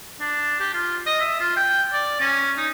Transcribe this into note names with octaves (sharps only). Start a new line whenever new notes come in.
D4
G4
F4
D#5
E5
F4
G5
D5
C#4
D#4